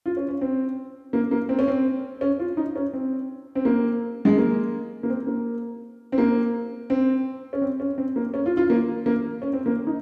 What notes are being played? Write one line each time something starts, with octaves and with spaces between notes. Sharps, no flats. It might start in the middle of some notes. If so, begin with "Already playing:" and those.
F4
C#4
C#4
C4
A#3
A#3
C4
C#4
C4
C#4
F4
D#4
C#4
C4
C4
A#3
G#3
A#3
A#3
C4
A#3
C4
A#3
C4
C#4
C4
C#4
C4
A#3
C#4
F4
F4
A#3
A#3
C#4
C4
A#3
D#4